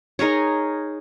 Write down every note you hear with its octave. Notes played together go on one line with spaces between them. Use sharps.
D#4 G#4 A#4 C#5